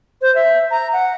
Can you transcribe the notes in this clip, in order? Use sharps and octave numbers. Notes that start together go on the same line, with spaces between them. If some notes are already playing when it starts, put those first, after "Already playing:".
C5
E5
A#5
F#5